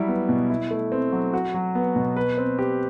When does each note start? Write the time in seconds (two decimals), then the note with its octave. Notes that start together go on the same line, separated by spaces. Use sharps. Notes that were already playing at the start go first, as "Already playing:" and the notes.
Already playing: F#3 G3 E4
0.08 B3
0.29 B2
0.50 E4
0.71 A3
0.92 C4
1.12 F#3
1.33 F#4
1.54 F#3
1.75 B3
1.96 B2
2.16 B4
2.38 C4
2.59 G4